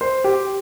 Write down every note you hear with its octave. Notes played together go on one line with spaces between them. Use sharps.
C5
G4